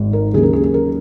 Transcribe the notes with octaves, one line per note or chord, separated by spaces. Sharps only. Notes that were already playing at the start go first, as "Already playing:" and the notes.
Already playing: G#1 G#2 D#3
A#4
D#2 C#3 F#3 G#4
A#4
G#4
G#4
A#4